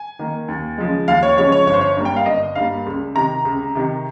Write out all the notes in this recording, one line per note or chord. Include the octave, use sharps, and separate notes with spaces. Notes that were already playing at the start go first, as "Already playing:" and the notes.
Already playing: G#5
D#3 A#3
D#2
C#3 F3 G#3
D#2 F5
C#5
C#3 F3 G#3 C#5
C#5
G1 C#5
C5
C#5
G2 G3 A#3
G5
F5
G1 D#5
G2 G3 A#3 F5
C#2
C3 D#3 A#5
C#2
C3 D#3